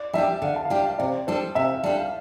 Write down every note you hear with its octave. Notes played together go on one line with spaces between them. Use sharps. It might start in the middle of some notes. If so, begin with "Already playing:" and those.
Already playing: D5
G3 D4 G4 E5
D3 F5
A5
F5
G3 D4 G4 G5
F5
C3 D5
G3 D4 A4 C5
C3 E5
F5
G3 D4 A4 A5
F5